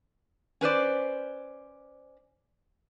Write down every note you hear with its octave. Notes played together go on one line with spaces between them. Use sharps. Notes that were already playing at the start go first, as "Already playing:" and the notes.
C#4 B4 C5 D5